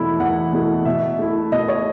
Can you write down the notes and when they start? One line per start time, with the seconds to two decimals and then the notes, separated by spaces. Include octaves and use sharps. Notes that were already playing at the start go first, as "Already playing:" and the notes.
Already playing: E2 B2 A3 E4 B5
0.19 E2 F#5
0.52 B2 A3 E4
0.85 B2 E5
1.19 A3 E4
1.52 B2 D#5
1.68 C#5